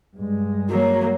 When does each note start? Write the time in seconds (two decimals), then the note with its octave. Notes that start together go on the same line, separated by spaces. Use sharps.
0.16 G2 G#3
0.70 F#3 A#3